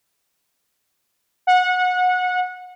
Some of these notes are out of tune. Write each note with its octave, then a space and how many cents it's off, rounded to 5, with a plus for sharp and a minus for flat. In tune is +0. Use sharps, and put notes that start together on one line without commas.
F#5 -25